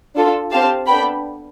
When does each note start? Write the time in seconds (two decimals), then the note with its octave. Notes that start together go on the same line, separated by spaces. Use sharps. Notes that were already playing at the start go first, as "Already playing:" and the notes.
0.16 D4 F4 A4
0.52 C4 G4 F5 A5
0.87 B3 D4 A4 G5 B5